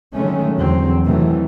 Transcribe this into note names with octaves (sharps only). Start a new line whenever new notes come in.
D3 D#3 F#3 G#3 A3 C#4
E2 D3 F#3 C4
C3 D#3 E3 F#3 A3